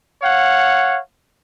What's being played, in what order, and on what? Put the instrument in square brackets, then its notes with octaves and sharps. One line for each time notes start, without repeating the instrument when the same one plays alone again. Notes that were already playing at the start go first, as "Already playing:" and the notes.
[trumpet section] C#5 F5 F#5